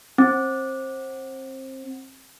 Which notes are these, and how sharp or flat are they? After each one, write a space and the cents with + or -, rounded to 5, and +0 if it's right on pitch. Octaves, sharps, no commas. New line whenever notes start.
C4 +25